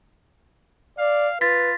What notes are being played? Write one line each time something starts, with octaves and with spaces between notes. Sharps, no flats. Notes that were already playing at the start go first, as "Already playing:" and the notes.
D5 F5
F4 B4 A6 B6